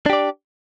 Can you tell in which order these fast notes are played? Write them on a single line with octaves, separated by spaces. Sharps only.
D4 G4 D5